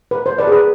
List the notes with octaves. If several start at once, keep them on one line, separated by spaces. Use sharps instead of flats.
B4
C5
B4 D5
G#4
B4